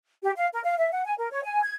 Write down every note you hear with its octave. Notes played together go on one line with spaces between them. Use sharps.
G4
F5
A#4
F5
E5
F#5
G#5
A#4
C#5
G#5
G#6